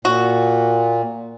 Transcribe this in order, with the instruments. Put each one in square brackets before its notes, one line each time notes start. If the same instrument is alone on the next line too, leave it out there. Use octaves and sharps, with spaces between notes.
[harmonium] A#2 [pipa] F#4